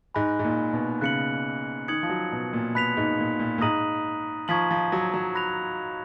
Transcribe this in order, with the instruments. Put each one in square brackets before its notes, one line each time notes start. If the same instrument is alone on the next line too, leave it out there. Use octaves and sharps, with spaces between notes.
[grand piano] G#2 [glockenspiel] G#5 B5 F#6 A#6
[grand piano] G#2
A#2
B2
[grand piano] C#3 [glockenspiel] F#6 C#7 F#7
[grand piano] D#3 [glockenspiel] D#6 G#6 C#7 F#7
[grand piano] F3
F#3
B2
A#2
[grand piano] B2 [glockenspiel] B5 F#6 B6 F7
[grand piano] G#2
A#2
A#2
A#2
[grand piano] G#2 [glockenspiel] A#5 D#6 A#6 D#7 F#7
[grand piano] F3 [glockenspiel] A#5 C#6 G#6 B6 F#7
[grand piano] F3
F#3
F#3
[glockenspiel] B5 F#6 A#6 F7